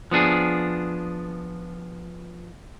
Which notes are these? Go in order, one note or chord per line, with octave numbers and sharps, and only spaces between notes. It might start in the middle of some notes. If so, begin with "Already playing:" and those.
F3 B3 D4 G#4